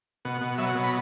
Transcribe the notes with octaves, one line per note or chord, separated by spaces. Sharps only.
B2 F#5
B2
F#3 E5
F#5
B2
B5